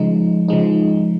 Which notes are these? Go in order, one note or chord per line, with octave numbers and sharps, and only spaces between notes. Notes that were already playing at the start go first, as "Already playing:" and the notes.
Already playing: C#3 F3 G#3 D#4
C#3 F3 G#3 D#4